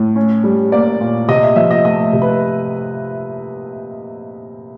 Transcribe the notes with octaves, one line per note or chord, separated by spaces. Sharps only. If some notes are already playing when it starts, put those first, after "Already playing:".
Already playing: A2
C#4
G3
A#3 D5
A#2
C3 D#5
E5
F3 E5
D#5
A3 D#5
C3
B4